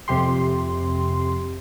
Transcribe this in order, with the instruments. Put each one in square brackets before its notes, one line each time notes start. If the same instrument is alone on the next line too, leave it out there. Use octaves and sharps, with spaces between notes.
[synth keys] F2 C3 G4 C6